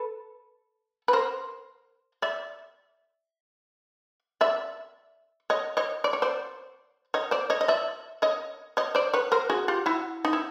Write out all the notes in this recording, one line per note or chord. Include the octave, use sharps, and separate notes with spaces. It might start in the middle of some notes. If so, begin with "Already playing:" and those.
Already playing: A4 B4
B4
A#4 C5
D5 E5
D5 E5
C#5 D#5
C#5 D#5
D5
C#5
C5 D5
C#5 D#5
C5 D5
C#5 D#5
D#5
D5 E5
C#5 D#5
C#5 D#5
C5 D5
B4 C#5
A#4 C5
F#4 G#4
F4 G4
E4 F#4
D#4
E4